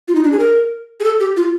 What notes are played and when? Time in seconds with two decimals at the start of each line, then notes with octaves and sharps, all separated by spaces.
0.08 F4
0.15 D#4
0.24 D4
0.32 G#4
0.39 A#4
1.00 G#4
1.04 A4
1.20 G4
1.37 F4